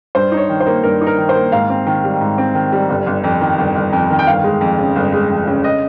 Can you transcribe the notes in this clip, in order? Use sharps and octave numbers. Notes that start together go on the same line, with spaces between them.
G2 C5
D#4
C#5
D#3
C5
A#3
G2 A#4
D#4
A#4
D#3
C5
A#3
G#2 F5
C4
D#3
G3
G#2
C4
D#3
G3
G1
G1
F2
D#3
G1
G1
F2
D#3
G5
G1 F5
G#3
F2
C#3
G1
G#3
F2
C#3
D#5